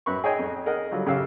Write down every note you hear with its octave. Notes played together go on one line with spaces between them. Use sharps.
F#2 B4 C#6
G#4 C#5 D#5 G5 G#5
F2
G#4 A#4 D#5 F#5
D3 F#3 G3 F4
F#2 C#3 F#3 G4 F5 E6